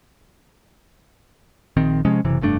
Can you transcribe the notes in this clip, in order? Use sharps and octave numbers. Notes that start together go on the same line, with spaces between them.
A#1 D#3 C4
C3 F3 G#3 C#4
F#1 C3 E3
F1 G2 A3 D4